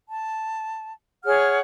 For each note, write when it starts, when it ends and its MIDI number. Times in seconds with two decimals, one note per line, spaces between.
0.08 0.93 81
1.25 1.58 68
1.25 1.58 73
1.25 1.58 78
1.25 1.58 89